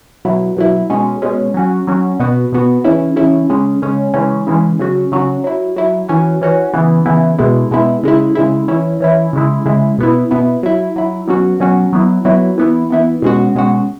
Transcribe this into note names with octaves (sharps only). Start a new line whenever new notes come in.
B2 F#3 E4
B2 F#3 E4
B2 G#3 C#4
B2 G#3 C#4
F#3 C#4 F#4
F#3 C#4 F#4
B2 B3 F#4
B2 B3 F#4
C#3 E3 C#4 E4
C#3 E3 C#4 E4
C#3 G#3 C#4
C#3 G#3 C#4
C#3 E3 G#3 C#4
C#3 E3 G#3 C#4
C#3 F#3 C#4 F#4
C#3 F#3 C#4 F#4
F#3 E4
F#3 E4
E3 C#4 F#4
E3 C#4 F#4
C#3 E3 B3 E4
C#3 E3 B3 E4
B2 G#3 B3 E4
B2 G#3 B3 E4
C#3 G#3 E4
C#3 G#3 E4
E3 C#4 E4
E3 C#4 E4
C#3 G#3 E4
C#3 G#3 E4
B2 B3 E4
B2 B3 E4
F#3 E4
F#3 E4
B2 F#3 C#4 F#4
B2 F#3 C#4 F#4
F#3 B3 E4
F#3 B3 E4
E3 B3 E4
E3 B3 E4
B2 G#3 C#4 F#4
B2 G#3 C#4 F#4